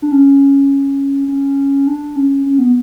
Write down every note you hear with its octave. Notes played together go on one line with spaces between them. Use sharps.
D4
C#4
C#4
D4
C#4
C#4
B3